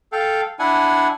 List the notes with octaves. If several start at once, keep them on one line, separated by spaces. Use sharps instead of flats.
A4 F5 G5
D4 E4 F#5 G#5